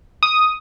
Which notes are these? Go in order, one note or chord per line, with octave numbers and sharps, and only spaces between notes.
D#6